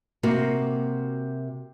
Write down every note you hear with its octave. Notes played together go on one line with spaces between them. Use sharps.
C3 A#3 F#4